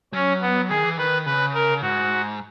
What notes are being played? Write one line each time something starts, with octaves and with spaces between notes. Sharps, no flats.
F#3 C#4
B3
D#3 G#4
E3
D#3 B4
C#3 B4
A#4
G#2 F#4